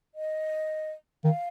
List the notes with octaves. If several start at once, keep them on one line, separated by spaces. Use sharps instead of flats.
D#5
D#3 F5